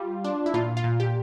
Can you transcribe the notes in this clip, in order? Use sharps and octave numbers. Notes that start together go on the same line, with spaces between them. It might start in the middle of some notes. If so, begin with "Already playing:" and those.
Already playing: G3 F4
D4
E4
A#2 F4
F4
A#2
G4